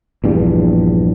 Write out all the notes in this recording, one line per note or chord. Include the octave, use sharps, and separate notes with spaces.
A#1 E2 G2